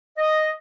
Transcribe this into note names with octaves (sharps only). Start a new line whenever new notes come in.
D#5